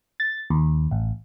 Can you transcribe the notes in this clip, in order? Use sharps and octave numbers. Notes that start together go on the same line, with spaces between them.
A6
D#2
A1